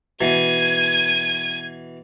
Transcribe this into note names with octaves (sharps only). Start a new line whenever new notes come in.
B2 E3 G#6 D#7